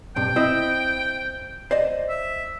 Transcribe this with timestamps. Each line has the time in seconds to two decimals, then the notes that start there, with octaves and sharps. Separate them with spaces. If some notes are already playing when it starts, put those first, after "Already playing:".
0.16 B1 G2 C3 G5
0.36 C4 E4 D#5
1.71 C5 D5 D#5
2.09 E5